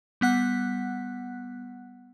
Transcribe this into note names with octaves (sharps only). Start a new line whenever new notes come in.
G3 B3 F#5 F#6